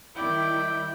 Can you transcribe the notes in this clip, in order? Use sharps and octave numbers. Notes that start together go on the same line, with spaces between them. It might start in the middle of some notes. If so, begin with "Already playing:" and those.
D#3 G3 E4 D5 G5